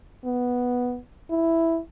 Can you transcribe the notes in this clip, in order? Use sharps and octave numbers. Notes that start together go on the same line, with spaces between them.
B3
E4